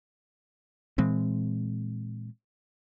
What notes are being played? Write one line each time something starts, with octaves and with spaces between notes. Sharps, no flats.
A#2 E3 G#3 C4